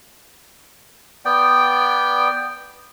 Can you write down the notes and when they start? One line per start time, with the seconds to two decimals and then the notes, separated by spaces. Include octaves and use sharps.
1.25 B3 D5 G5